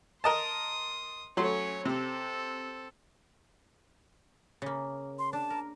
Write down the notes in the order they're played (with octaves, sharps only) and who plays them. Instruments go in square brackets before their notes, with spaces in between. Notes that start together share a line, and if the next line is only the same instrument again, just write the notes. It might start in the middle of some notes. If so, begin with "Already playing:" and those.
[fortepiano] A#4 D#5 A5 [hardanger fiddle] C6 D#6
[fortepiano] F#3 A3 C6 [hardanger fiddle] C#4 C#5
[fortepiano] C3 [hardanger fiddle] C4 A4
[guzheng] C#3 A#3
[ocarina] C6
[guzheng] D4 [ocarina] A5
[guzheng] A#4